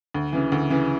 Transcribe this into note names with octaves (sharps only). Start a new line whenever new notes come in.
D2
C#3 E3
D2
C#3 E3